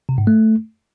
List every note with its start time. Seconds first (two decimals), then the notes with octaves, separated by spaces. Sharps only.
0.09 C3
0.18 G#2
0.27 A3